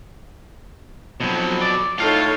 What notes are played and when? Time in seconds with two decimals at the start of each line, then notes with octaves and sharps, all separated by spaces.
1.20 F2 B2 F#3
1.61 D5
1.98 A2 D#4 F4 A4 C#5 F5